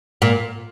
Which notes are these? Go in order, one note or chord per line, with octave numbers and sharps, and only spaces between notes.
A#2